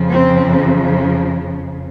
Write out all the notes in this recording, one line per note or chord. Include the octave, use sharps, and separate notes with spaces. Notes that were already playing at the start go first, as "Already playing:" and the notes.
Already playing: F2 C#3 F3
C4